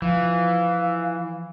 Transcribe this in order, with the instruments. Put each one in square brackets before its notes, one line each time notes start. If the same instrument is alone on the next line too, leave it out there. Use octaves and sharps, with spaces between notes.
[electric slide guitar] E3 [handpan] F3 [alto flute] F5